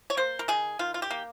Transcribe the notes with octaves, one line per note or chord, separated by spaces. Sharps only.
C#5
A#3 C5
A#4
D#3 G#4
D#3 F4
F4
G4
A#3